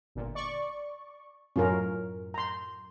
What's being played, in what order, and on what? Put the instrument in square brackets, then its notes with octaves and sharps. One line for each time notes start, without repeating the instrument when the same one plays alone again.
[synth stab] G1 A#2
D5 C#6
[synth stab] F#2 A2 [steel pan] C#4 F4 A#4
[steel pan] A#5 C6